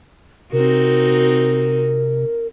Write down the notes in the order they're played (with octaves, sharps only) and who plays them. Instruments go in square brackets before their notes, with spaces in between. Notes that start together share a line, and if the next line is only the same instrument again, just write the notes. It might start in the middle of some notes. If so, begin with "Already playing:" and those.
[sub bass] C3 [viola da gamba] C4 D#4 F#4 [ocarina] A#4